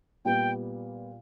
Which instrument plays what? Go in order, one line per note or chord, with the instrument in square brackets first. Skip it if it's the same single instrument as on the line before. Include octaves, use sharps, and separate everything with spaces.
[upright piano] A#2 G3 B3 [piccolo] G5